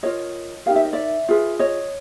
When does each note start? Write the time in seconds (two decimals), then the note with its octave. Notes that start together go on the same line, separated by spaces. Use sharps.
0.03 F4 A#4 C#5 D#5
0.66 D#4 G4 A#4 F5
0.76 E5
0.85 D#5
0.93 D5 E5
1.29 F4 G#4 B4
1.59 C#5 D#5